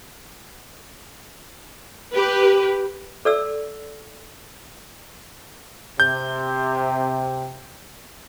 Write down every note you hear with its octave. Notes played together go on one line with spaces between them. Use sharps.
G4 B4
A4 D5 E6
C3 G6